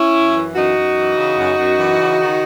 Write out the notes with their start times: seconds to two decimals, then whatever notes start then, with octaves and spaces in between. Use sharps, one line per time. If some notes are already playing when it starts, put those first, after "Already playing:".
Already playing: C#4 E4
0.14 F#2
0.35 E3
0.55 F#2 D#4 F#4
0.76 F#2
0.96 E3
1.17 C#3
1.37 F#2
1.57 F#2
1.78 E3
1.98 C#3
2.19 D#3